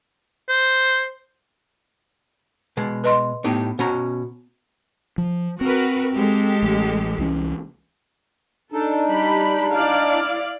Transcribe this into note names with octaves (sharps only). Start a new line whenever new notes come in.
C5
B2 G#3
B4 D#5 C6
A2 B3 D#4 G4
B2 C#4 A#5
F3
C4 F#4 A#4 B4
G#3 G4 A4
A1 A3
C2 E3 C#4
D4 D#4 A4
G3 G4 B5
E4 D5 F5